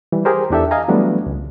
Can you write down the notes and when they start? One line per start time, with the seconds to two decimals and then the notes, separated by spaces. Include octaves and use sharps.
0.12 E3 G3
0.25 G4 G#4 A#4 C5
0.50 E2 E3 D4 G4 A4 E5
0.71 D#5 F5 G#5 A#5
0.88 E3 F#3 G3 A3 B3 D4
1.26 C#2